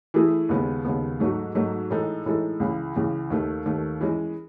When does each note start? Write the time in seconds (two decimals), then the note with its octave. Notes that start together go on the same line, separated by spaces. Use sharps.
0.14 E3 A3 E4 G#4
0.49 D#2 C#3 G#3 B3
0.85 D#2 C#3 G#3 B3
1.20 G#2 F#3 A3 D#4 F#4
1.55 G#2 F#3 A3 D#4 F#4
1.91 A2 E3 G#3 D#4 A4
2.26 A2 E3 G#3 D#4 A4
2.60 C#2 C#3 E3
2.95 C#2 C#3 E3
3.30 D#2 D#3 A3
3.66 D#2 D#3 A3
4.01 E3 G#3 C#4